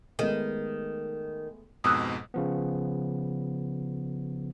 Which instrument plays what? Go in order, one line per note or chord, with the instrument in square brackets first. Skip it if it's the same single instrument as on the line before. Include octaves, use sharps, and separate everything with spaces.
[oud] D#3 [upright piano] G#3 A3 B3
[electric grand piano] F2 G#2 B2 [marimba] D#6 E6 F#6
[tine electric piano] C#3 F3 B3